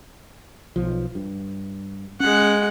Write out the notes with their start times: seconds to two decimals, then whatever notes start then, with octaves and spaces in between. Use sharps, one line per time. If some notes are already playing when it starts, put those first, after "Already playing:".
0.76 B1 F3
1.15 G2
2.20 G#3 C#4 F#5